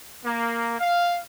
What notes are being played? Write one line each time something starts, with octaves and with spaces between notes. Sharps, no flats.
A#3
F5